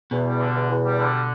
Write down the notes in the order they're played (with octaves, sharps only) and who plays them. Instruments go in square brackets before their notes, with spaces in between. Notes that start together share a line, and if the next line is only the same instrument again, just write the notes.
[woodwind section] E2 [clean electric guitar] B2
[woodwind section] G3
D3
E2
E2
G3
D3